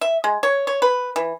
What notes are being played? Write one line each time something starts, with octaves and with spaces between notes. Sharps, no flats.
E5
G#3
C#5
C#5
B4
E3